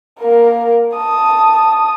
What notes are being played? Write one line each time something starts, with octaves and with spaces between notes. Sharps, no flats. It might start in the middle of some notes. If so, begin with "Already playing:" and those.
A#3 A#4
A5 D#6